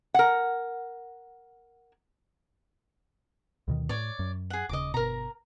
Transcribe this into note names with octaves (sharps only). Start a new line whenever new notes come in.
A#4 F#5
D2 B2 D#3
A2 C#5 D5
F#2
G#4 F#5
D#1 C#3 D#5 D6
G1 B2 A#4 A#5